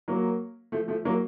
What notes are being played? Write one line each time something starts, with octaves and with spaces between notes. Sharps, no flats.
F#3 A#3
F3 A3
F3 A3
F#3 A#3